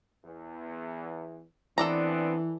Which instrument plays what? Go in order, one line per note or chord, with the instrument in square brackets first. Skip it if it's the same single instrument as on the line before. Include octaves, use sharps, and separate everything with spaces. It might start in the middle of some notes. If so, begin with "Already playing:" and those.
[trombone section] E2
[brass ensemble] E3 [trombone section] B3 C4 D4 [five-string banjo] A4 D5 A#5